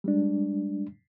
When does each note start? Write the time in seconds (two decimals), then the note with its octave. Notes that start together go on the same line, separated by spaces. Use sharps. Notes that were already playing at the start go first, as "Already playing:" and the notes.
0.04 G3 G#3 D4